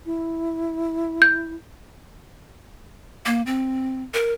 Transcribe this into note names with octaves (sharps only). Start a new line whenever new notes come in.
E4
G6
A#3
C4
A#4